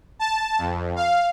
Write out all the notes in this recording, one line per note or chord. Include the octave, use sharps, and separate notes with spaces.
A5
F2
F5